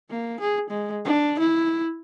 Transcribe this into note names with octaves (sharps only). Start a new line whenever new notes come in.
A#3
G#4
G#3
D4
E4